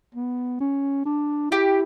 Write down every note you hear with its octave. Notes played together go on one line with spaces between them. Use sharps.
B3
C#4
D4
E4 G4